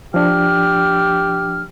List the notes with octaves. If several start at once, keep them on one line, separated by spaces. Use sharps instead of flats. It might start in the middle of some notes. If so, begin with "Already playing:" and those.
F3 D4 G4 F6